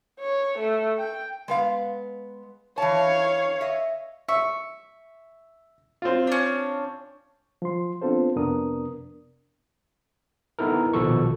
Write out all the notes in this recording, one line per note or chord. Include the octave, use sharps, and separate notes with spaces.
C#5
A3
G5
G#3 B3 F5
E3 C#5 F5 A5
D#5 E5
E5 C#6
C4 F4
C#4 D4
F3 C6
B3 C4 D4 F4 A4 C5
F2 C3 B3 D4 A#4 D#6
B3 D#4 E4 A4 A#4
A#1 B2 D#3 F3 A4 C#6